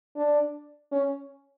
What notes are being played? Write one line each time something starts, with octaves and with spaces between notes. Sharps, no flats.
D4
C#4